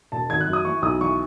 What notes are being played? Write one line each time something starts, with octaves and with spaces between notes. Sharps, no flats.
E1 A5
G#1 G#6
F#6
F#2
D#6
E3 C#6
B1 D#6
E3 C#6